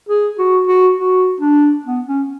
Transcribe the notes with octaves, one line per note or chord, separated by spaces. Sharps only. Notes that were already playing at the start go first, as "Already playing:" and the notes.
G#4
F#4
F#4
F#4
D4
B3
C#4